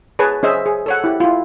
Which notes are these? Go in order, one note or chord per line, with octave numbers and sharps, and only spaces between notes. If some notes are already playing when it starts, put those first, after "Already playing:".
G#4 B4 C#5 A5
C#4 G#4 C5 D#5 E5
G#4
A4 C#5 F#5
E4 G4
E4 F4